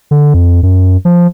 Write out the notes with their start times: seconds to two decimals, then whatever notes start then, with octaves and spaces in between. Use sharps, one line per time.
0.11 D3
0.34 F2
0.63 F#2
1.05 F3